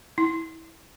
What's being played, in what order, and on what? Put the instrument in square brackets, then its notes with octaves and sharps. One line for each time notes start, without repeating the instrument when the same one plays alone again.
[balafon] E4